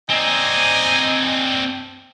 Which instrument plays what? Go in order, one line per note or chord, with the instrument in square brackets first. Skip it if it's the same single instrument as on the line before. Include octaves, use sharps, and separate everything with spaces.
[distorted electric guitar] C4 D4 [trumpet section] D#4 D#5 G#5